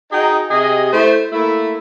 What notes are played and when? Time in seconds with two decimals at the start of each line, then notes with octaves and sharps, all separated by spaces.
0.12 D#4 F#4 G#4 D#5 G5
0.51 C3 G4 G#4 D#5
0.93 A3 E4 C5
1.33 A3 A#3 E4